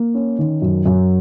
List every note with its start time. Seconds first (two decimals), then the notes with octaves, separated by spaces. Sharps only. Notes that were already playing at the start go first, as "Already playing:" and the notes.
Already playing: A#3
0.14 C#4
0.39 D#3
0.62 F#2
0.86 F#2